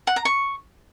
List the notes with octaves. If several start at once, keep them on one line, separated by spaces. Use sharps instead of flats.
F#5
A#5
C#6